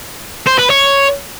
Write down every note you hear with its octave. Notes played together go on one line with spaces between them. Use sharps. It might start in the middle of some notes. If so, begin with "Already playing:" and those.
C5
B4
C#5